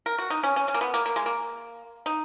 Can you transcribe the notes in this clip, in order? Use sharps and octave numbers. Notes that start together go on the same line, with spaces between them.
A#4
F#4
D#4
C#4
C#4
C#4
A#3
B3
A#3
A#3
G#3
A#3
D#4